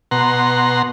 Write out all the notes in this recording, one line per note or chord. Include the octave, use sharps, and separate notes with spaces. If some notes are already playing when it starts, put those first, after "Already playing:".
B2 F#5 A#5 C6